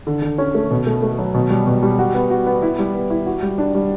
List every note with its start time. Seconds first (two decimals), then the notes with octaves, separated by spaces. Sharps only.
0.07 D3
0.22 D3
0.38 C#4
0.55 A3
0.70 B2
0.87 A3
1.03 A3
1.18 F#3
1.34 B2
1.50 G3
1.67 B2
1.83 G3
1.99 F#4
2.15 B3
2.30 F#4
2.46 B3
2.62 E4
2.79 G3
2.95 B3
3.10 E4
3.26 F#4
3.42 G3
3.58 D4
3.75 G3